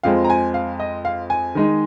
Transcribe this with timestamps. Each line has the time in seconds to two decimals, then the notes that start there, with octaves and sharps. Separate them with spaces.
0.03 F2 F3 G#3 C4 F5
0.24 A#5
0.30 G#5
0.54 F5
0.80 D#5
1.05 F5
1.30 G#5
1.55 D#3 G#3 D#4